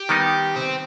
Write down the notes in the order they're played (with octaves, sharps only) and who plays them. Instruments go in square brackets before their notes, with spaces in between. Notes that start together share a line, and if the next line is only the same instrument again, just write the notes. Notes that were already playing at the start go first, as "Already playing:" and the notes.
Already playing: [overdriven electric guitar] G4
[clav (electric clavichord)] D#3 G3 B3 D#4
[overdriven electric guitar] C4